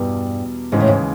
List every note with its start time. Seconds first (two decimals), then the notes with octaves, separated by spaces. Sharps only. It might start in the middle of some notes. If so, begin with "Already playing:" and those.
Already playing: E2 G2 B2 G3
0.72 D#2 G#2 C#3 E3 G#3
0.80 A2
0.88 G#2